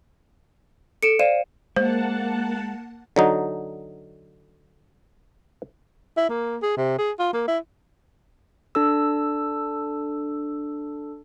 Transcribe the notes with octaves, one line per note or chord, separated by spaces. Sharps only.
A4 C#7 D7 E7
C5 D5 F5 D#7 E7
G#3 A#3 C5 F#5 A5
D3 F#3 D#4
E4
A#3
G#4
C3
G#4
F4
A#3
E4
D4 A4 E6